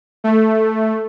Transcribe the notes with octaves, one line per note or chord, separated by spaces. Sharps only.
A3